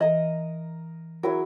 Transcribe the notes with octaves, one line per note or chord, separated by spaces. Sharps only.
E3 A#4 D#5 A#5 D#6
F#3 E4 G#4 A#4